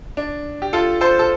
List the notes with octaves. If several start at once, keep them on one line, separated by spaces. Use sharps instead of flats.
D4
G4
F4 A4
A4 C5
A4